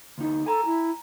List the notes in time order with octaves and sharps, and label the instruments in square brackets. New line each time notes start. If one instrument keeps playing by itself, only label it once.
[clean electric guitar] D2 D#4
[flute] A4 [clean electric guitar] G#5 A#5
[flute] E4